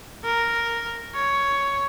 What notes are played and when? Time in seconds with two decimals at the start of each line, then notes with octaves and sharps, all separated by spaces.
0.24 A#4
1.16 C#5